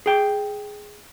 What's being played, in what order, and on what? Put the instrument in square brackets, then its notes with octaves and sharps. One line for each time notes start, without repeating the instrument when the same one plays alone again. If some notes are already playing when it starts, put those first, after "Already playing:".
[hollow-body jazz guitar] G#4 G5